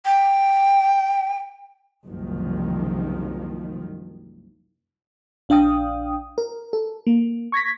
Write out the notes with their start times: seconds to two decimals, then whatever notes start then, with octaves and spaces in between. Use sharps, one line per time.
0.05 G5
2.05 F#1 C2 D#3 F3
5.49 A#1 D4 F5 G5 D#6
6.38 A#4
6.73 A4
7.07 A#3
7.52 C#6 G#6 A#6 B6